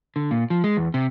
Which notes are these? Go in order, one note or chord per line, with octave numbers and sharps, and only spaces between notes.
D3
A#2
F3
G#3
E2
C3